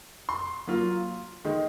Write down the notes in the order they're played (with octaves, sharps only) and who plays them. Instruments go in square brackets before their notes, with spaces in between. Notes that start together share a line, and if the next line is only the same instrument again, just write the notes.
[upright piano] C6
F#3 A#3 F4
D#3 G#3 D#4